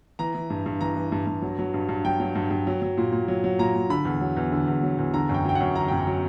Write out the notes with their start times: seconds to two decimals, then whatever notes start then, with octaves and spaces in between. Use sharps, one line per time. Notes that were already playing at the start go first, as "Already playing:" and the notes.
0.19 E3 A#5
0.35 E3
0.50 G2
0.66 G2
0.81 E3 A#5
0.97 E3
1.12 G2
1.27 G2
1.42 F#3
1.59 F#3
1.74 G2
1.89 G2
2.05 F#3 G5
2.20 F#3
2.35 G2
2.51 G2
2.67 F#3
2.82 F#3
2.98 A#2
3.12 A#2
3.28 F#3
3.44 F#3
3.59 A#2 A#5
3.75 A#2
3.90 D3 B5
4.05 E2
4.21 F#3
4.37 E2
4.52 D3
4.68 E2
4.83 F#3
4.98 E2
5.14 D3 A#5
5.29 F#2
5.34 G5
5.45 F#3 G5
5.55 F#2 F#5
5.75 D3 A#5
5.88 F#2 G5
6.00 A#5
6.07 F#3